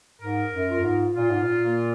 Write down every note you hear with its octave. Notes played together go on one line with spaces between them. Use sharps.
G#2 A#4
F#2
F4
F#2
G#2
A#2 F4
G#2
A#2
A#3